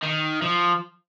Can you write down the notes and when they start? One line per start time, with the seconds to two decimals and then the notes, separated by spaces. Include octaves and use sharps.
0.03 D#3
0.42 F3